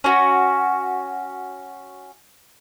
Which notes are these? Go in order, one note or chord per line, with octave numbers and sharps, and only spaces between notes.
C#4 F#4